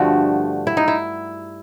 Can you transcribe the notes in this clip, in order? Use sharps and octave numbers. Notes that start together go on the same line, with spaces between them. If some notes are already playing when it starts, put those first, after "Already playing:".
Already playing: G2 D3 F3 A3 F#4
E4
D#4
E4